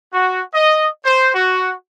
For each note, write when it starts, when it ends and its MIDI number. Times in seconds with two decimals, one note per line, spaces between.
0.13 0.42 66
0.54 0.87 75
1.04 1.31 72
1.34 1.74 66